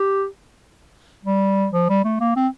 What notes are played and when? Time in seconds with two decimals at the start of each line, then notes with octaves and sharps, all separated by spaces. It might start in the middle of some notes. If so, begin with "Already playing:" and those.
Already playing: G4
1.25 G3
1.72 F3
1.89 G3
2.04 A3
2.20 A#3
2.36 C4